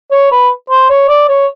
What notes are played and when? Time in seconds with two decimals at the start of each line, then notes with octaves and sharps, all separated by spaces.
0.11 C#5
0.31 B4
0.70 C5
0.89 C#5
1.08 D5
1.28 C#5